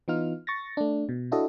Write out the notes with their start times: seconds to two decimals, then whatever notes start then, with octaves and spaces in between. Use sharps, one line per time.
0.08 E3 B3 D#4 F4 F6
0.47 C#6 A6 A#6
0.77 A3 D4
1.09 B2
1.32 D4 E4 F#4 A4 D#5